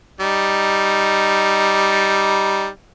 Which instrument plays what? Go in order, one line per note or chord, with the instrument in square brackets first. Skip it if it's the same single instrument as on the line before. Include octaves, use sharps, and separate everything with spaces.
[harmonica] G3 D#4